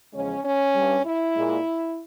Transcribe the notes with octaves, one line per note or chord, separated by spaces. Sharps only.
E2 C#3 F3 G#3 C#4
C#4
G2 G3
E4
A#2 G#3